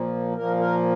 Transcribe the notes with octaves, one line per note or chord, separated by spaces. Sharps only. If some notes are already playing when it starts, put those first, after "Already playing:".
Already playing: A#2 F3 A#3
A#2 F3 A#3 A#4
A#4